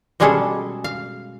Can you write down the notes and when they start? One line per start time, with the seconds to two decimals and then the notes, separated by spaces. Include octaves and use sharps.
0.20 B2 G3 G#3 C#4 G#4 A4
0.84 F5